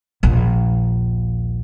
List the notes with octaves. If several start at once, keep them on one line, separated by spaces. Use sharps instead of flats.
A#1 D#2